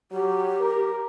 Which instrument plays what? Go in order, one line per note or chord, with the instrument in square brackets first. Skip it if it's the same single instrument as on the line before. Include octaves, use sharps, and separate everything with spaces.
[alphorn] F#3 [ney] G4
[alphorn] A#4